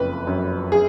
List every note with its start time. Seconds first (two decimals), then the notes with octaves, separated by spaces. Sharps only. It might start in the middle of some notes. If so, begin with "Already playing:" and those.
Already playing: F#1 F2 B4
0.27 F#2
0.72 G#4